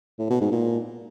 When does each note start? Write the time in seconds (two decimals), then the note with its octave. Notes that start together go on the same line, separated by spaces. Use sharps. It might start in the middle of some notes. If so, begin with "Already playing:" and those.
0.19 A2
0.30 B2
0.41 G#2
0.52 A#2